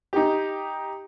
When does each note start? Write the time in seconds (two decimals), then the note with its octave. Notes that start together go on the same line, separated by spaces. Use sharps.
0.13 D#4 G4